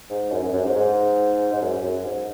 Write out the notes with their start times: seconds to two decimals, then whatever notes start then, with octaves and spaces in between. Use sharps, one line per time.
0.10 G#2
0.32 F#2
0.43 F#2
0.53 F#2
0.64 G#2
0.75 G#2
1.53 G#2
1.62 F#2
1.83 F#2
2.05 G#2